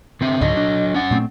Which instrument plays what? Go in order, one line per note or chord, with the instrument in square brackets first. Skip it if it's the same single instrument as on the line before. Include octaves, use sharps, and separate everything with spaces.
[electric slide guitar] D3 C4 E5
[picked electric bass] C#2 G#2 D3 [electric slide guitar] F#3 D#5
[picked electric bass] D4
[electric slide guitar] C#4 F#5
[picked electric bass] A#2 A3 C4